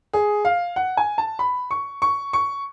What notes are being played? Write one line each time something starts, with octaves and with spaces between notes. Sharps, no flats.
G#4
F5
F#5
G#5
A5
B5
C#6
C#6
C#6